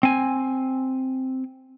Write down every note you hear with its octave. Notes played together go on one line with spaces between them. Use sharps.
C4 G#5